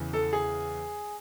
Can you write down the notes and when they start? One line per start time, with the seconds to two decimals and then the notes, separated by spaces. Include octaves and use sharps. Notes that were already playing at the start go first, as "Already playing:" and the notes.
Already playing: E2 C#3 E3
0.13 A4
0.33 G#4